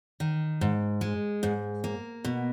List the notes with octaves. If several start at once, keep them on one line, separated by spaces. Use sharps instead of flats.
D#3
G#2
G#3
G#2
A#3
B2